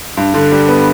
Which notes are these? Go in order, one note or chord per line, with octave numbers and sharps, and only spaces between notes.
G2
D3
G3
B3